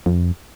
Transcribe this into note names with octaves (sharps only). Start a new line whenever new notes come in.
F2